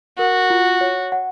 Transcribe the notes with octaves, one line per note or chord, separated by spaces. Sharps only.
F#4 A#4
F4
C#5
F#5